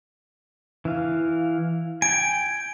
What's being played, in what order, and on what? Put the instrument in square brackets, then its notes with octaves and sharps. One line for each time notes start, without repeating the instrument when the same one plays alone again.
[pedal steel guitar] E3 F5
[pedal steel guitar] G5 G#5 [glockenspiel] D7